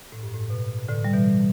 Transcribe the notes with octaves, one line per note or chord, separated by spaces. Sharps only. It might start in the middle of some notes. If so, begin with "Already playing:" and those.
A2
G2
A2
B2
A2 D3
G3
B2 E3